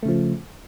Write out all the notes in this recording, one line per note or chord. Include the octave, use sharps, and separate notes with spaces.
C#3 F3 A3